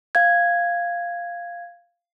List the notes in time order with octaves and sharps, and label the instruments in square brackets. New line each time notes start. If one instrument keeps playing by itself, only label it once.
[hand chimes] F5 G#6